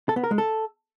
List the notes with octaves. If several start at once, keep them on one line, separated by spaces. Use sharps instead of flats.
A4
B3
A#4
G#3
A4